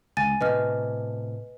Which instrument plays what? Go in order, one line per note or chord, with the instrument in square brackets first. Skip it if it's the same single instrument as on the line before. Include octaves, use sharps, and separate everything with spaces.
[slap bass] C#2 [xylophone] G#5 A6 D#7
[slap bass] A2 C3 [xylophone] B4 D#5 F6